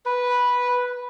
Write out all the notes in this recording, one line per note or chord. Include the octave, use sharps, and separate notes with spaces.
B4